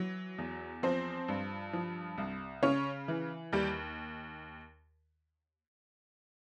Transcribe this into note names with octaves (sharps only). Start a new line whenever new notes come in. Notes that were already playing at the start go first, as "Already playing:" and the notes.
Already playing: E3 F#3
E2
F3 C4 C5
G2
F3
C2
C#3 C#4 C#5
E3
D#2 G3 G4